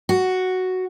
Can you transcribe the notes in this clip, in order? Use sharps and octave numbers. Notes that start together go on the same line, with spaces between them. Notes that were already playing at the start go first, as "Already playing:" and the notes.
F#4